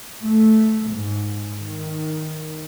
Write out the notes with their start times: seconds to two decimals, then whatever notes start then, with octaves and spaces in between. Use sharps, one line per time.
0.23 A3
0.91 G#2
1.56 D#3